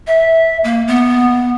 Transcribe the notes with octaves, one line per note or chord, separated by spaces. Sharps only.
E5
A#3
B3